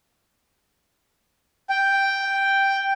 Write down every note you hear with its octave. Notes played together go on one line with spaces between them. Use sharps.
G5